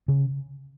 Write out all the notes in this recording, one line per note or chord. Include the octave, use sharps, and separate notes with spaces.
C#3